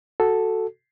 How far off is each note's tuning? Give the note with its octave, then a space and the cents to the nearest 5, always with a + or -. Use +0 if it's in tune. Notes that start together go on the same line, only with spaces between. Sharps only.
F#4 +0 A4 +0